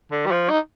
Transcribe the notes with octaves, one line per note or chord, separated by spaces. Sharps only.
D3
G3
F3
D#4